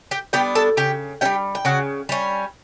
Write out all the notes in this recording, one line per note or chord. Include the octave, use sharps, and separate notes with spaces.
G4 G5
G3 B3 D4 G4 G5
A4 A5
C#3 G4 G5
G3 C#4 G4 G5
G5
C#3 F#4 F#5
G3 C#4